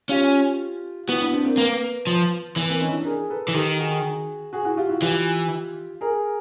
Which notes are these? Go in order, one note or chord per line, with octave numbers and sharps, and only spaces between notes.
C#4 F4 G4
B3 E4 F#4
D4 E4
C4 D4
A#3 C4
A#3 B3
F3
E3 B3
A#3 C4
C#4 D#4
D4 E4
G#4 A#4
A4 B4
E3
D#3 G4 A4
F#4 G#4
F#4 G#4
E4 F#4
F4 G4
E4 F#4
E3 F4 G4
G#4 A#4